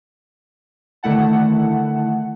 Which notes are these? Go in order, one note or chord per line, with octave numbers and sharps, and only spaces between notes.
D3 D#3 A3 E4 F#5 A5